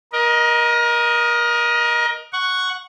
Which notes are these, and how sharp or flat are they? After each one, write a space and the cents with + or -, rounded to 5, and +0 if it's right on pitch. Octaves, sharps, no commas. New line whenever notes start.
A#4 +30 D#5 +0
F#5 +0 C#6 +0